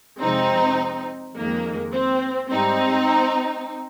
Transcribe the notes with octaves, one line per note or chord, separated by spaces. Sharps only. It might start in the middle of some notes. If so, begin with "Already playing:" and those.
F2 C3 F3 G#3 C4 D#4
F2 D#3 G#3 A#3
C4
G#2 G3 C4 D#4